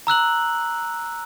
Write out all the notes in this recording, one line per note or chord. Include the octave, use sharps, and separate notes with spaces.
A#5 E6 F#6 F#7